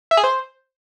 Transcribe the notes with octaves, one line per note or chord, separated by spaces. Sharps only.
E5
G#4
C5